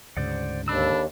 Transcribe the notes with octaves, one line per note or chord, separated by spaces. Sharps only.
D2 G#2 C#3 C5 D5 F#5
D#2 D4 A4 B5 E6